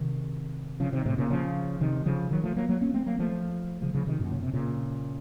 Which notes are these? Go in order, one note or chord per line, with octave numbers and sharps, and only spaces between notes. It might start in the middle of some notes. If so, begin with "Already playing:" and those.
Already playing: C3 D#3
C#3 F3
C3 D#3
A2 C3
A#2 C#3
C#3 F3
C3 D#3
C#3 F3
D#3 F#3
F3 A3
F#3 A#3
F#3 A#3
A#3 C#4
A3 C4
F#3 A#3
F3 A3
C#3 F3
C#3 F3
C3 D#3
F#2 A#2
C#3
C3
A#2 C#3